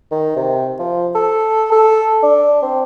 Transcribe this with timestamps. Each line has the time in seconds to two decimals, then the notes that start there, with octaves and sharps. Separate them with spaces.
0.11 D#3
0.36 C3
0.79 F3
1.15 A4
1.72 A4
2.23 D4
2.62 C4